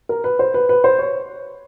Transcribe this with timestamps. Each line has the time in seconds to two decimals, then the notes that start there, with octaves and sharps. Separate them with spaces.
0.09 A#4
0.24 B4
0.39 C5
0.54 B4
0.69 B4
0.84 C5
0.99 C#5